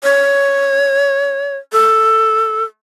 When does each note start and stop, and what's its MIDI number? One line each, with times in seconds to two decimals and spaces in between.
0.03 1.57 73
1.73 2.63 69